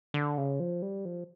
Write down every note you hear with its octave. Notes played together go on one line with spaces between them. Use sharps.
D3
C#3
F3
G3
F3